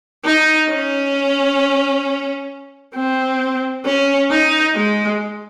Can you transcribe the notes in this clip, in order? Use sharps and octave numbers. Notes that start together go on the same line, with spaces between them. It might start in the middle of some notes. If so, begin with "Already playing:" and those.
D#4
C#4
C4
C#4
D#4
G#3